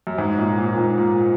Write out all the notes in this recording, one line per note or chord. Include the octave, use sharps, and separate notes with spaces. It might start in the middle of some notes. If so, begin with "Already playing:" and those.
F#2
G#2
A#2
A#2
G#2
A#2